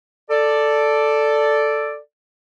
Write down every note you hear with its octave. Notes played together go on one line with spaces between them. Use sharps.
A4 D5